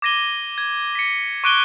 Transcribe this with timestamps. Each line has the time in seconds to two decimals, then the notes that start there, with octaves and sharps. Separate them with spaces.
0.02 D6 G#6 A#6 D#7 G7
0.58 G#6
0.95 B6 C#7
1.44 C#6 D6 F#6 D7 D#7 G7